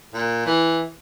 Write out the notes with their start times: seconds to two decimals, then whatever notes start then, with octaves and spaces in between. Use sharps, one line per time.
0.13 A#2
0.46 E3